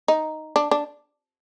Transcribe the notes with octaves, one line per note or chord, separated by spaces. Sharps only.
D#4
D4
D4